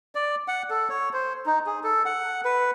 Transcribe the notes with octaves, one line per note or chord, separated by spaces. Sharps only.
D5
F#5
A4
C#5
C5
D#4
G#4
A4
F#5
B4